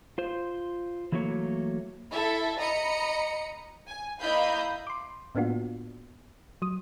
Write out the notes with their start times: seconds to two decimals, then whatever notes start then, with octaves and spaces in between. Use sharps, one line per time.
0.18 F4 C5
1.12 E3 F#3 A3 A#3 C#5
2.13 E4 A4 E5
2.58 D#5 A#5 B5 C#7
3.87 G#5
4.20 A#3 E4 D#5 F5 B5 G6
4.87 C6 D6
5.35 A2 A#3 B3 D4 F4 F#4
6.62 F#3 D#6